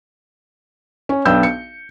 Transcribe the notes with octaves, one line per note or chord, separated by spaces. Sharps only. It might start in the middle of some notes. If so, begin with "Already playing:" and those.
C#4
B1 B3 D4 G5 E6 G6
C#7